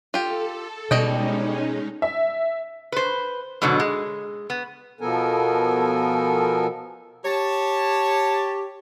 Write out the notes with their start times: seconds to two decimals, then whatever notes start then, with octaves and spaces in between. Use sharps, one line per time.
0.14 F4 G4 A4
0.91 B2 G3 G#3 C#4 D#4 D#5 G5
2.02 E5
2.92 B4 C5
3.62 G#2 B2 D3 F#3
3.80 G#3
4.50 B3
5.01 B2 F3 B3 A4 A#4 G#5
7.25 G4 C#5 A5